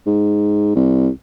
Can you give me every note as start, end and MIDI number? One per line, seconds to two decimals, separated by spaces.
0.07 0.75 44
0.75 1.09 36